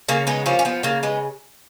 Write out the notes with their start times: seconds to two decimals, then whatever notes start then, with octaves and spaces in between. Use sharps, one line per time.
0.08 C#3 A#3 C#4
0.27 G#3 B3 D#4
0.46 F3 A#3 C#4
0.59 C#4
0.65 F3 B3
0.83 C#3 A#3
1.03 G#3 B3